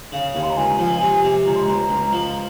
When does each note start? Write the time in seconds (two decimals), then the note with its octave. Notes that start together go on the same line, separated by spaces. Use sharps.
0.12 C#3 F5
0.35 D#2
0.42 C6
0.50 A#5
0.57 C#2 G#5
0.79 F3
1.01 C3
1.24 C3
1.46 C#2 A#5
1.54 C6
1.63 A#5
1.68 C#2
1.90 C#2
2.13 F3